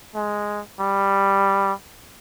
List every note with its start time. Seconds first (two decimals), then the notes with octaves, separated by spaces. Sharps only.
0.15 G#3
0.80 G3